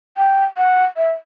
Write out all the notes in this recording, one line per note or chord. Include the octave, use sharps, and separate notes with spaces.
G5
F#5
E5